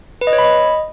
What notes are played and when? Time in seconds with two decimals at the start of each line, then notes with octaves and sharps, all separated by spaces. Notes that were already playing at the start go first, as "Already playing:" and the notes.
0.21 B4
0.27 D#5
0.33 C#5
0.38 B5
0.44 D#5